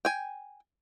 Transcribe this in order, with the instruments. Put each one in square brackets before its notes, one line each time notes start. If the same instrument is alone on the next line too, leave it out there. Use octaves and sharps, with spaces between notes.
[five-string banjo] G5 G#5